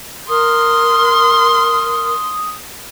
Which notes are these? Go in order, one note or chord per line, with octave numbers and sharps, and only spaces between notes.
A#4 C6 D#6